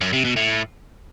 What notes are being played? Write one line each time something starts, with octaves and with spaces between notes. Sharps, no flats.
F#2
C3
B2
A2